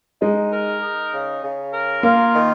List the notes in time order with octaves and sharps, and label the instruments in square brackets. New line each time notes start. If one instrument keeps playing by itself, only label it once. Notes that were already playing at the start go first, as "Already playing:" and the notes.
[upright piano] G#3 [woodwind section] D#4
[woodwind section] A#4
D#4
C#3
C#3
A#4
[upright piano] A#3 [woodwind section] F4
[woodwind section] D#3